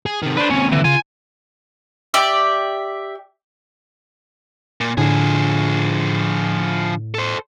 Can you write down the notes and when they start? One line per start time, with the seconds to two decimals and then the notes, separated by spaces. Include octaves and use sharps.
0.06 G#4
0.22 C3 D#3
0.37 D4 B4 C5
0.50 D#2 C3 C#4
0.72 D3 E3
0.85 C#3 F4 G#5
2.14 G4 D5 E5
4.81 A#2
4.98 A2 D3 F3 G#4
7.14 A4 C5